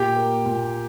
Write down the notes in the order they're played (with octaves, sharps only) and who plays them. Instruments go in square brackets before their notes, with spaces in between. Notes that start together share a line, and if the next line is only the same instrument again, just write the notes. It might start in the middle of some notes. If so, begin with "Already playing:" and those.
Already playing: [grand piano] A#2 G4 G5
A#3
A#2